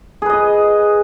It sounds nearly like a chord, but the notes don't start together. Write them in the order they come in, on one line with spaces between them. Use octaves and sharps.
G#4 B4 D#5